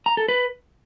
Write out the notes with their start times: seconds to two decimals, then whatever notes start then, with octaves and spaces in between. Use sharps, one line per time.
0.06 A#5
0.17 A4
0.29 B4